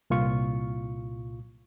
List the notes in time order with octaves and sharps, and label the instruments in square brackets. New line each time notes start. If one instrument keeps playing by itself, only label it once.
[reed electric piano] C2 A#2 F4 C#6